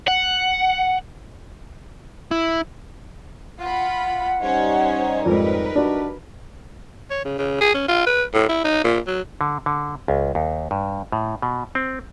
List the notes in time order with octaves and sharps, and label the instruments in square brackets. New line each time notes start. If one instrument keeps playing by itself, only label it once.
[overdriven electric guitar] F#5
[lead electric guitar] E4
[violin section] F4 B5 [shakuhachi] F#5
[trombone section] G3 D#4 [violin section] C#4 C5 C#5
[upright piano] F2 G#2 [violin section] A#4 B4
[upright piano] D4 F#4
[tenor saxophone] C#5
C#3
C#3
G#4
C#4
F4
B4
A2
E4
D#4
A#2
F#3
[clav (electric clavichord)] D3
D3
C#2
D#2
G2
A2
B2
C4